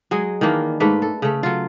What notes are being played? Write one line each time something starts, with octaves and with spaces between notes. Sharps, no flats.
F#3 G#3 G#4
D#3 E3 A#3 D4
G#2 A3 A#3 B4
A4
C#3 A3
F#3 F4